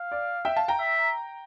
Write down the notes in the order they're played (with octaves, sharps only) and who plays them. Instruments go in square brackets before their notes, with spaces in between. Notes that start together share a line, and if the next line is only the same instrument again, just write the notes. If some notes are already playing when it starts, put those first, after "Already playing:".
Already playing: [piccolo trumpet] F5
[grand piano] D5
E5 G5
F5 A5
G5 A#5
[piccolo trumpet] E5